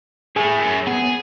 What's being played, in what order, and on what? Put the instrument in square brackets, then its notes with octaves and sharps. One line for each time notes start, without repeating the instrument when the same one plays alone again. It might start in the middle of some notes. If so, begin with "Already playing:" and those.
[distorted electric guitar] A2 A3 [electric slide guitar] G#4 G#5
[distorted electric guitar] F#2
[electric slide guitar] B3 [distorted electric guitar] G#4